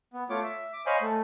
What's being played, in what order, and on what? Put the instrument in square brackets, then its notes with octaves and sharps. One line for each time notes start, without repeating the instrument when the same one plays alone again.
[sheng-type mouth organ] B3
A3 F4 C#5 D6
E5
D6
C5 C#5 D#5 F5 G#5 B5
A3